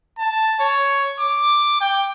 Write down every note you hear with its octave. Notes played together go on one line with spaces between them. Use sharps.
A5
C#5
D6
G5